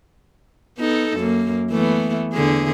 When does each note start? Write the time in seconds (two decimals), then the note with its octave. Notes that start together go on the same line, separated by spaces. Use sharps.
0.79 B3 D#4 A4
1.16 F#2 A#3
1.71 E3 A3 B3
2.33 E2 D3 G#4